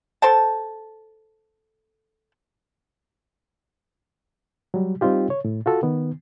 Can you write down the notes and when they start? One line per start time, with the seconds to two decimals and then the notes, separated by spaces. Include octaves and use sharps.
0.22 A4 C5 G5 A5
4.74 F#3 G3
5.01 G3 C4 D#4 F4 G4
5.30 C#5
5.45 A2
5.66 F4 F#4 A4
5.83 D#3 B3